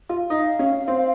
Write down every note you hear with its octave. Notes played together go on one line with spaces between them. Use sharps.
F4
D#4 F5
C#4
C4